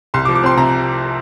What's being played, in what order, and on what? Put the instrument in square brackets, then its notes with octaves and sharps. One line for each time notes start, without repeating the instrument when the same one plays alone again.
[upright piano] C2 C6
D6
F3
D6
C4 C6
C3 A#5